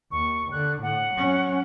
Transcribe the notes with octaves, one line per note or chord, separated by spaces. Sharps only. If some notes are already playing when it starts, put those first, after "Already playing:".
D#2 C#6
D3 F#6
A2 F#5
F#3 C#4